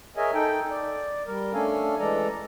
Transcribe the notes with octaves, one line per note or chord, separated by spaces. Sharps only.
G#4 A#4 C#5 D#5 E5 G#5
D#4 A4 G5
D5
G3 A#4
A3 C#4 D4 A4 F5 G#5
E3 G#3 A4 D5 A#5